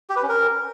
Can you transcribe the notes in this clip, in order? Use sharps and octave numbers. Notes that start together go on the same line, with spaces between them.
G4
B4
C#4
A#4